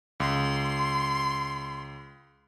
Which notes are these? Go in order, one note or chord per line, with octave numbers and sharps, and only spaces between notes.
C#2 C6